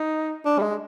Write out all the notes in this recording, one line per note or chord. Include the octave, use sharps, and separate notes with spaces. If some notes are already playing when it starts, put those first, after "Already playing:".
Already playing: D#4
D4
G3
G#3